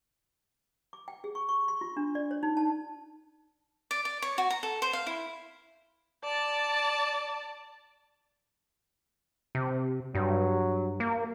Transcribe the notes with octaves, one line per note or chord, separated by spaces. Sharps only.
D6
G5
G#4
C#6
C#6
C6
F4
D4
D5
C#5
D#4
A5
D5
D5
C#5
F#4
A#5
A4
C5
F5
E4
D5 A5
C3
G2 F#3
A#3